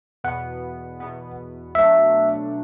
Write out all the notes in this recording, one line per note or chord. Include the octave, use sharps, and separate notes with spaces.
E2 B2 B3 F#5
E2 B2 B3
B2 F#3 A3 D4 E5